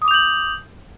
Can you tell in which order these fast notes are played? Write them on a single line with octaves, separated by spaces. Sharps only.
D#6 D6 F7 G6 F#7